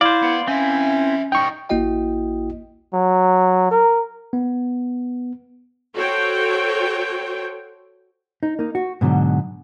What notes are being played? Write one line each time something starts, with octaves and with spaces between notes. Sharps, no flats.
E4 C5 D5 F5
B3
C4 C#4 E4 E5 G#5
G3 D#4 G5 C#6
A1 A#3 E4 F#4 D#5 G5
F#3
A#4
B3
F#4 A4 C5 C#5 G5
D#4
A#3 D#4
F#4
G#2 B2 D3 F#3